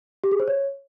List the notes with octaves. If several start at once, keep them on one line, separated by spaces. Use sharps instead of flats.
G4
G#4
C5
C#5